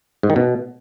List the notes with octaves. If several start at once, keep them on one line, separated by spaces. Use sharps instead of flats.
G#2
D#3
B2